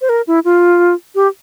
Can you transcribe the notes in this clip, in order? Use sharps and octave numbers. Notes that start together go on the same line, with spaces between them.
C5
A#4
E4
F4
G4